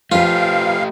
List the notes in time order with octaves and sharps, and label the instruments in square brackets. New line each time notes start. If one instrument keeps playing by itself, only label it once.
[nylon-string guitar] F3 B4 [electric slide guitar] A3 G4 [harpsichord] F4 [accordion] F5